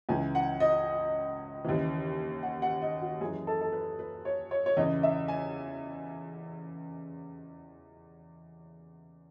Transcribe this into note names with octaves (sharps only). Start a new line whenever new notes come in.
C#2 C#3 E3 G#5
F#5
D#5
D#2 C#3 E3
F#5
F#5
D#5
F#4
F#2 E3 G#4
A4
A4
B4
B4
C#5
C#5
C#5
E2 C#3 E3 D#5
E5
G#5